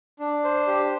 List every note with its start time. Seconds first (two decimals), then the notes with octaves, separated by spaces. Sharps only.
0.19 D4
0.44 C5
0.67 G4